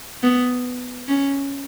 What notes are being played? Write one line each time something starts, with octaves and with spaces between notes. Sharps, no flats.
B3
C#4